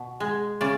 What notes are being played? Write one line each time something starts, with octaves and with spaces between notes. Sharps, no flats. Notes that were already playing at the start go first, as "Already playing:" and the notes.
Already playing: B2
G#3
C#3 D5